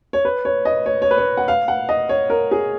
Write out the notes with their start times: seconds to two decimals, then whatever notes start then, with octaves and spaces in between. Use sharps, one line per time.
0.13 C#5
0.25 B4
0.45 C#5
0.65 D#5
0.86 C#5
1.02 C#5
1.11 B4
1.18 C#5
1.37 F#5
1.48 F5
1.68 F#5
1.89 D#5
2.09 C#5
2.30 A#4
2.51 G#4